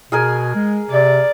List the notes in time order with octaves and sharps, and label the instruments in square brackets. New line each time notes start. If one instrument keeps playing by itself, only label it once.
[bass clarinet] B2 [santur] G#4 A#4 G#5
[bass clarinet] G#3
[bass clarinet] C3 [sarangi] D5